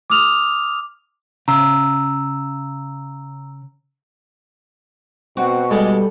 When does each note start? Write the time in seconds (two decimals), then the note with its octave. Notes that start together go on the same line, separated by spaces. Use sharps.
0.10 D6 D#6 F6 F7
1.48 C#3 A#5 E6
5.37 B2 C4 F#4 F#5
5.71 G3 G#3 A4